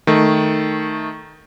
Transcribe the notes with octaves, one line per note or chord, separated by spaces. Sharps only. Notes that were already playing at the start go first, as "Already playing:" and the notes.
D#3 A3